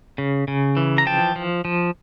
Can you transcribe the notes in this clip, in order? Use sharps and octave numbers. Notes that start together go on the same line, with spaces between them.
C#3
C#3
E3
A#5
F3 G5 A5
F3
F3